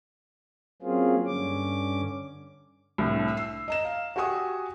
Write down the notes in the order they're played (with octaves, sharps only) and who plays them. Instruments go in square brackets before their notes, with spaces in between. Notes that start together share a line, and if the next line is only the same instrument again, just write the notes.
[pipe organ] F#3 A#3 C4 C#4 F4 G#4
G2 D3 C#4 D6
[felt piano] C2 A2 D3
E6 C7
D#5 A#5 E7
F5
F#4 G4 F#5 G#5 C#6 D#6